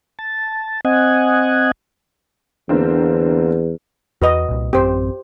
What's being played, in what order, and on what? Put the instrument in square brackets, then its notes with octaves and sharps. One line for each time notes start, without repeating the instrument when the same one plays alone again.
[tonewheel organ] A5
C4 D#5 F#5 G#5
[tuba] E2 [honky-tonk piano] D3 A#3 C4
[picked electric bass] E2 [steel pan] F#4 B4 D#5
[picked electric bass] C2 A#2
[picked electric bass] A1 F#2 C4 [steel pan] G4 C5